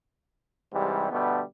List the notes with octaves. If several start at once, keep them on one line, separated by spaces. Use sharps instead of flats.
G#2 C3 E3 G3
B2 D3 G3 A3 B3